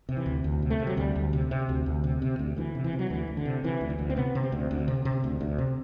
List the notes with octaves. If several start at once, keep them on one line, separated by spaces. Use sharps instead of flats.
C3
E3
D2
D2
C3
A3
C3
F#3
D2 G3
D2
C3
C3
D2
D2
C3
C3
D2
D2 E3
C3
E3
C3
F#3
D2 E3
D2
D3
C3
C3 E3
D2
E3
D2
C4
C3 B3
C3
C4
D2
D2
C3
C3
D2
D2
C3